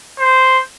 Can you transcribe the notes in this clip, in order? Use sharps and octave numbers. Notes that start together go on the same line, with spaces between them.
C5